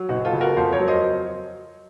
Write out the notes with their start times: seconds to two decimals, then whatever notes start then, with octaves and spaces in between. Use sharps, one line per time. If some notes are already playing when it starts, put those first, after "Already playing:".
Already playing: F#3
0.09 F#1 D#4 F#4
0.25 F4 A4
0.33 C#3
0.41 F#4 A#4
0.57 F2 A4 C5
0.72 A#4 C#5
0.80 F#3
0.88 C5 D#5